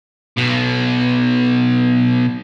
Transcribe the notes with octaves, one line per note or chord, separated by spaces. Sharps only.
B1 B2